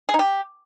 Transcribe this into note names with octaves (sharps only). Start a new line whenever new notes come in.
G#4
D#4
G4